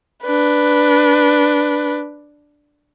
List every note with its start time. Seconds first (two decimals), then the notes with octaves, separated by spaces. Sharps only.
0.24 D4 B4